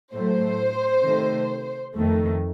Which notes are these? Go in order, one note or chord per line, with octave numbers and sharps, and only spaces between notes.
A2 F#3 A3 C5
C3 D#3 A3
F2 D#3 A3